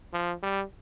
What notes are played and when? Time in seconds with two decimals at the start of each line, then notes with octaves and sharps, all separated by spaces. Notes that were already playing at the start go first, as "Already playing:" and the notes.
0.13 F3
0.43 G3